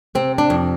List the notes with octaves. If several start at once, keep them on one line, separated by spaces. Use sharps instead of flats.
C3 C4
D4
F2